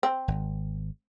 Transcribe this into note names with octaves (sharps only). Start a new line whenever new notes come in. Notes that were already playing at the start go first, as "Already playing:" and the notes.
C4
G#1